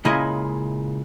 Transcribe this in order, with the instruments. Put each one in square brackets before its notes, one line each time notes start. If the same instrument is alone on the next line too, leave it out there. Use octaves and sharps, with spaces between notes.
[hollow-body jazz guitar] A#2 C#3 G#3 E4 C#5 D#5